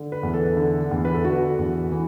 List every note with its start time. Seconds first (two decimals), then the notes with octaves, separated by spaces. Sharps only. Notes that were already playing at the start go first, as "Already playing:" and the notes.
Already playing: D3
0.12 B4
0.23 E2
0.34 A4
0.57 D3
0.91 E2
1.05 B4
1.15 A4
1.24 D3 F#4
1.59 E2
1.92 E3